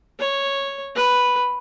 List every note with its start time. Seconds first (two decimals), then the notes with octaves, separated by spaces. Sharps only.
0.19 C#5
0.96 B4